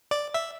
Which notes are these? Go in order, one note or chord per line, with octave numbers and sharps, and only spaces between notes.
D5
E5